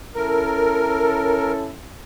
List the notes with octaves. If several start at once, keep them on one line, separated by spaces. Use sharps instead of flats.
C#4 E4 A4 A#4